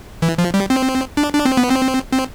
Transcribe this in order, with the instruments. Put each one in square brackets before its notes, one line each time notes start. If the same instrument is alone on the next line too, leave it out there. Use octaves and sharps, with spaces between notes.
[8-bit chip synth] E3
F3
G3
C4
D4
D4
C4
B3
C4
C4